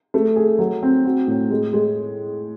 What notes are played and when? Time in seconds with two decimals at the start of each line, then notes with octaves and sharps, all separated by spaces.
0.14 A3
0.36 G#4
0.59 F#3
0.83 C4
1.05 F#4
1.27 A2
1.50 G#3
1.73 G#3